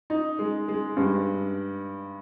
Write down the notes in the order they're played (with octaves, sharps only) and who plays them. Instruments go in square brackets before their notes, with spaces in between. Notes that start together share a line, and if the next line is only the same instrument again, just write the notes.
[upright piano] D#4
G#3
G#3
G2